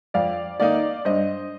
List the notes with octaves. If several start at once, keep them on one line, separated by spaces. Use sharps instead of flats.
F2 D5 F5
D#3 A#3 D#4 D5 F5
G2 C5 D#5